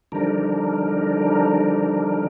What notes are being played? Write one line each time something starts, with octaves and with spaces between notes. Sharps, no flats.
D3 F3 G3 D4 D#4 A#4